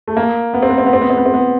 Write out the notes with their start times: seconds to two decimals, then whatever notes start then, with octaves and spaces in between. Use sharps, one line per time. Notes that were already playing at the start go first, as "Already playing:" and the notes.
0.08 A3
0.17 A#3
0.54 B3
0.63 C4
0.70 B3
0.78 C4
0.86 B3
0.93 C4
1.01 B3
1.10 C4
1.17 B3
1.26 C4
1.34 B3